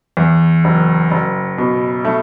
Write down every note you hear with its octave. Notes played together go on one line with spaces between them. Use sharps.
E2
F#1
F#1
B2
A3